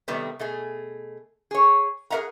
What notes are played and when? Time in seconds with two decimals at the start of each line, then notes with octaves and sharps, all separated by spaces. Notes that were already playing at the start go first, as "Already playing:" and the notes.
0.08 C3 D#3 G3 A3 B3
0.39 B2 A3 G#4
1.51 G#4 C#5
2.10 G#4 A#4 B4 E5 F#5 A#5